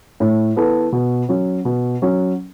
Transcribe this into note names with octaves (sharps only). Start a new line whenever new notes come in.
A2
E3 B3 A4
B2
F#3 C#4
B2
F#3 C#4